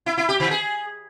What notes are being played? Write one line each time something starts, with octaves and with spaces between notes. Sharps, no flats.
E4
E4
G4
D#3
G#4